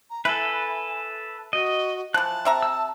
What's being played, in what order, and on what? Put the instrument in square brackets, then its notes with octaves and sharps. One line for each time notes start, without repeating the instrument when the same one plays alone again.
[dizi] A#5
[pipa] E4 [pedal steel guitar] A4 B4 [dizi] G#5
[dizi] F#4 [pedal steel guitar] D#5
[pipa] E3 F3 [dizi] A5 [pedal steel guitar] F#6
[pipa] C3 E5 A#5
[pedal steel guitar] E6